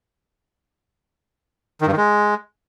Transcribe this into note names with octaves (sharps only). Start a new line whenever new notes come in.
D#3
G2
D#3
G#3